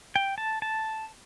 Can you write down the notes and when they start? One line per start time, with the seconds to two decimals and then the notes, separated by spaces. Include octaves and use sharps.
0.16 G5
0.38 A5
0.62 A5